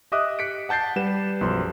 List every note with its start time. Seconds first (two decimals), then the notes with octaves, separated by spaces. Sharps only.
0.12 G4 D#5 E5 D6 D#6 F#6
0.39 F#6 B6 C#7 D7
0.69 F#5 A5 G6 A6 C7
0.96 G3 G4 B4 E7
1.41 B1 F#2 F3 C6